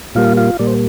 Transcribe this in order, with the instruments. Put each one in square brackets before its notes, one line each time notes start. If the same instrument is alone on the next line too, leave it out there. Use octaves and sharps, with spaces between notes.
[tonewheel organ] A#2 G3 A#3 F4 F5
F4 F5
A#2 G3 A#3 D5
C5